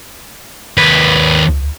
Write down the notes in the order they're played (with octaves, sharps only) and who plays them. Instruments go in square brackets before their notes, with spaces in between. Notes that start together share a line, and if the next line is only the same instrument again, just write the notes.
[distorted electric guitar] D#2 B4